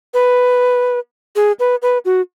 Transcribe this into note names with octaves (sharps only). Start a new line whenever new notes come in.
B4
G#4
B4
B4
F#4